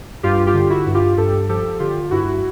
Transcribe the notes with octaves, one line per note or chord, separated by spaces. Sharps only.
G2 F4 G4
F4 G4
D3
E4 F#4
G2
F4 G4
G2 G4 A4
F3 G4 A4
D3 F4 G4
G2 E4 F#4